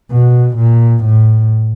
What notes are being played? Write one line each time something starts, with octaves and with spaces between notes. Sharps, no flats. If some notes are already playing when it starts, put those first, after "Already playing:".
B2
A#2
A2